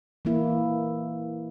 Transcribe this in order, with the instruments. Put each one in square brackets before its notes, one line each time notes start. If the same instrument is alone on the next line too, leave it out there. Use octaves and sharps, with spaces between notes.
[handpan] E3 A#3 E4